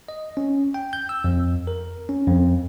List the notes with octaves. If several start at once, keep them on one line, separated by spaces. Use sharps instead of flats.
D#5
C#4
G5
G6
E6
F2
A#4
C#4
F2